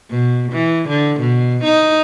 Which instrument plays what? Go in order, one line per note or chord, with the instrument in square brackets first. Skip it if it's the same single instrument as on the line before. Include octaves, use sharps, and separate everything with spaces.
[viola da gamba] B2
E3
D3
B2
D#4